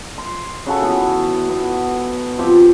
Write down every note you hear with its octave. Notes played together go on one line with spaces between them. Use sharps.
C6
C#3 F#4 A4
E3 B3
B3
F3 C4 G4